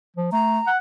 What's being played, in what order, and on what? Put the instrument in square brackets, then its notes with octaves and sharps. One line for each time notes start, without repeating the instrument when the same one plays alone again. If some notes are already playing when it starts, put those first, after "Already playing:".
[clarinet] F3
[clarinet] A3 [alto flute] A#5
[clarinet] F#5